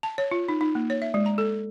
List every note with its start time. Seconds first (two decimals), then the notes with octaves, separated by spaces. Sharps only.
0.03 A5
0.18 C#5
0.31 F4
0.49 D#4
0.61 D#4
0.75 A#3
0.90 C#5
1.02 E5
1.14 G#3
1.26 A#5
1.38 A4